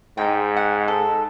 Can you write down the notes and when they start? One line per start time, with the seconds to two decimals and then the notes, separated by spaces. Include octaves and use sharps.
0.18 G#2 D#4 G5
0.57 F#5
0.88 A4